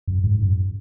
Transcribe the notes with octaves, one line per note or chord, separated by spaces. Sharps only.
F#2
G#2
F#2